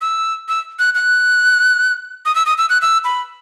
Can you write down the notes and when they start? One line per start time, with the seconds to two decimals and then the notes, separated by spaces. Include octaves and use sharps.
0.01 E6
0.49 E6
0.79 F#6
0.95 F#6
2.25 D#6
2.35 E6
2.46 D#6
2.58 E6
2.70 F#6
2.82 E6
3.04 B5